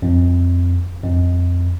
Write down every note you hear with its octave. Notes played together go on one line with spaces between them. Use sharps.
F2
F2